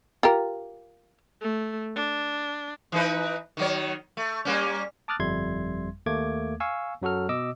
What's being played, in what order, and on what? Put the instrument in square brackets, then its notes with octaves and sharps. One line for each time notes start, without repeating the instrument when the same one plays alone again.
[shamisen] F4 G4 A#4
[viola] A3
D4
[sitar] E3 D#4 B4
D#3 F#3 C#5
A3
G3 A#3 C#4
[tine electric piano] A5 D6 D#6 F6 F#6 A6
G1 F2 G3 E5 C6 G#6
D#2 A3 A#3 D6 G#6
F5 G#5 C#6 E6
F#2 F#3 F#4 A4 F6
B2 D#5 D6 E6